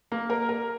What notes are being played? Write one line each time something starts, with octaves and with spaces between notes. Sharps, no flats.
A#3
A#4
A#4